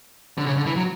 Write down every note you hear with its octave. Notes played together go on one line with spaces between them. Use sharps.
D3
C#3
D3
E3
F#3